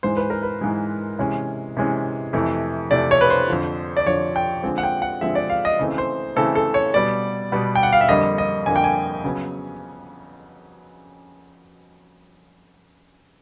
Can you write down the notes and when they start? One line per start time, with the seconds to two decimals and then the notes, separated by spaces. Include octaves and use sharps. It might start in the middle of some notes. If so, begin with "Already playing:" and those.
0.03 G#2 E3 G#3 C5
0.17 B4
0.30 A#4
0.43 B4
0.61 G#2 E3 G#3
1.19 C3 E3 G#3 C#4
1.77 C3 E3 G#3 C#4
2.33 F2 C3 E3 A3
2.91 F2 C3 E3 A3 D5
3.11 C#5
3.21 B4
3.30 C5
3.49 F2 D3 F3
3.97 D5
4.06 F2 D3 F3 C#5
4.36 G5
4.63 D3 F3 G#3 C4
4.78 F#5
4.83 G5
5.02 F#5
5.21 D3 F3 G#3 C4 E5
5.35 D5
5.50 F5
5.65 D#5
5.79 C#3 E3 A3 C4
5.98 C5
6.36 C#3 E3 A3 C4 A4
6.55 A4
6.74 C#5
6.94 B2 G3 B3 D5
7.52 B2 G3 B3
7.75 G5
7.83 F#5
7.93 F5
8.01 E5
8.08 F2 D3 G3 A#3 D#5
8.38 D#5
8.66 F2 D3 G3 A#3 G#5
8.76 G5
8.84 G#5
9.24 C#3 F#3 B3